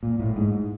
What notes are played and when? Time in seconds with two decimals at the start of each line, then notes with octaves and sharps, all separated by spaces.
0.03 A#2
0.20 A2
0.36 G#2